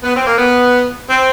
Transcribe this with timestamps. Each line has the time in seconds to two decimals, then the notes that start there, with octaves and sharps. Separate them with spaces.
0.03 B3
0.15 C4
0.27 A#3
0.38 B3
1.08 C4